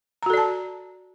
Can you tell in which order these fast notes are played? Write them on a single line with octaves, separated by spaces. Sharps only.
A#5 F#4 A4 D5 A5